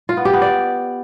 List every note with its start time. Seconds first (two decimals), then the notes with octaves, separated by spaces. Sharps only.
0.09 F4
0.17 B3
0.25 G4
0.33 B3
0.42 D5